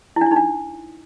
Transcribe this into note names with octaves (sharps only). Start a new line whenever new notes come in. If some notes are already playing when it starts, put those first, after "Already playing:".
E4
D4
E4
D#4
D4